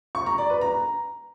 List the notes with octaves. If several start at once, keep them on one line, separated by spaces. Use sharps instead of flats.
C#6
A#5
D5
B4
A#5